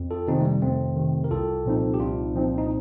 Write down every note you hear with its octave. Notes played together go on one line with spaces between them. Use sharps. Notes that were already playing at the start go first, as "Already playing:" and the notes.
Already playing: F2
F4 A4
C3 D#3 C4 D#4
A3
G3
F2 A3 C4
C3 D#3
A#4
C2 F4 A4
A#2 F3 C4 D#4
G4
C2 D4 F4
A#2 F3 C4 D#4
D#4